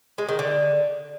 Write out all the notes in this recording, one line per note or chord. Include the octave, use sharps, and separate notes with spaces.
G#3
D#3
D3